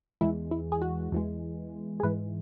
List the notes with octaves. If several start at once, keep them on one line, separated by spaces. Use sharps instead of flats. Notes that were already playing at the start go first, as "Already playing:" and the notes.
E2 E3 G#3 E4
E4
G#4
F#4
E2 E3 G#3
G#4
G#2 E3 G#3 B4